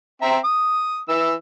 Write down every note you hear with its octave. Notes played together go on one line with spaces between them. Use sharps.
C4 E5 A#5
D#6
E3 E6